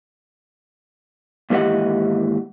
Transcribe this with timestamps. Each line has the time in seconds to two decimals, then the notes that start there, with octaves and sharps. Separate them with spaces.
1.50 D#2 G#2 E3 G4 D#5 F#5